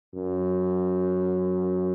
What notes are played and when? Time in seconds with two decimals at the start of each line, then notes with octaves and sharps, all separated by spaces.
0.14 F#2